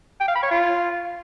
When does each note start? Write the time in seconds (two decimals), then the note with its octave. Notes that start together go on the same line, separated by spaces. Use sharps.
0.20 G5
0.28 F5
0.35 B5
0.43 C#5
0.50 F4